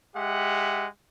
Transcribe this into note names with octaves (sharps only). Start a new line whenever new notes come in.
G#3 G4 E5 F#5